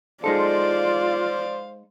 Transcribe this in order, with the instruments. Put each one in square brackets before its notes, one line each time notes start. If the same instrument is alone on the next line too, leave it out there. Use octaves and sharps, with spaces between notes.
[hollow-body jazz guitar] G#3 D#4 A4 [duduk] F4 [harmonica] C5 F5 [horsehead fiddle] D5